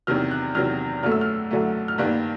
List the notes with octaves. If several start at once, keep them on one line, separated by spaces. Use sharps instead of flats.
E2 C3 D#3 F#3 F6
F#6
E2 C3 D#3 F#3 F6
F#2 D3 F#3 A3 F6
E6
F6
F#2 D3 F#3 A3
F6
G2 D#3 G3 A#3 F#6